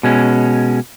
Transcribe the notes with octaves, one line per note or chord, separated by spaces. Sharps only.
B2 G#3 C#4